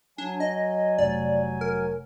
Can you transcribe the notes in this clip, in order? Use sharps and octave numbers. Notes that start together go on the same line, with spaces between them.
F#3 D4 G#5
D#5
F1 D5
A#4